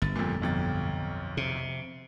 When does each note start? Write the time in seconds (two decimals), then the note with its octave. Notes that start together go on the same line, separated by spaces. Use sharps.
0.02 G1 A6
0.16 F2 A#2
0.42 B1 F2 A6
1.37 C3